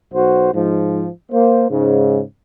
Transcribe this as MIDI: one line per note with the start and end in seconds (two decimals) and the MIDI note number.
0.13 0.48 35
0.13 0.48 66
0.13 0.48 72
0.53 1.07 44
0.53 1.07 53
1.32 1.65 58
1.32 1.65 72
1.70 2.21 44
1.70 2.21 49